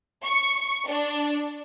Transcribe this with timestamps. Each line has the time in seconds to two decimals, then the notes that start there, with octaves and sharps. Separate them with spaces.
0.24 C#6
0.87 D4